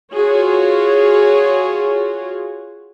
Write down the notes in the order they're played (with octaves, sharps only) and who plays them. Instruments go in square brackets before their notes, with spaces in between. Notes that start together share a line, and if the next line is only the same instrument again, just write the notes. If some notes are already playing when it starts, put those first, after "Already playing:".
[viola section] F4 F#4 G#4 C#5